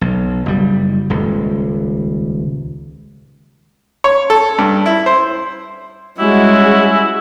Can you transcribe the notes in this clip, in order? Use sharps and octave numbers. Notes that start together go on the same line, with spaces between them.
B1
F#1 G3
D#1 C#2
C#5
A4
G2
E4
C5
G3 G#3 C#4 E4 F#4